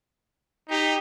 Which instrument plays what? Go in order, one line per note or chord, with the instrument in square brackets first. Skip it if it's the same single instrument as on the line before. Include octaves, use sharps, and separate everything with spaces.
[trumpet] D#4 [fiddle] G4